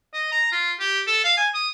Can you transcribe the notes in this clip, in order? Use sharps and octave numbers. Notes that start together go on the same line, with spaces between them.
D#5
A#5
F4
G4
A4
F5
G#5
D#6